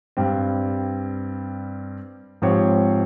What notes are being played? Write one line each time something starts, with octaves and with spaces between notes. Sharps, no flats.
G2 G3 C4
G#2 F3 C4 G4 C#5